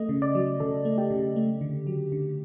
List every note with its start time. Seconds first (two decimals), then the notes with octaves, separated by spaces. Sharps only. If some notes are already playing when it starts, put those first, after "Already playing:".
Already playing: A3 D#5
0.09 C#3
0.22 D5
0.35 F#3
0.60 C#3 A4
0.85 A3
0.98 G4
1.11 C#3
1.36 A3
1.61 D3
1.87 F#3
2.12 D3